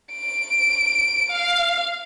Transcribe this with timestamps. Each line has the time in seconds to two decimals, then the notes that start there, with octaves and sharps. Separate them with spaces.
0.13 D7
1.30 F5